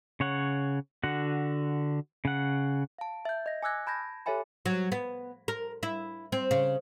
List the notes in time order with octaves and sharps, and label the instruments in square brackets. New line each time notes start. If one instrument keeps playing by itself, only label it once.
[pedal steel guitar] C#3 C#5 F#5
D3 F#4 F#5
C#3 F#5
[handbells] F5 A5
E5 G6
D#5 A#6
G#5 D6 E6 F#6 G#6 A#6
A5 B5 G6 G#6 A#6
G4 A4 C#5 E5 G#5 B5
[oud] F#3
B3
A#4
E4
C4
C#3